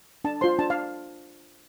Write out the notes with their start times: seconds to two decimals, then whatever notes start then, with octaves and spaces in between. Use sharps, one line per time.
0.24 D4 A5
0.41 F4 C5 C6
0.59 D4 A5
0.70 F5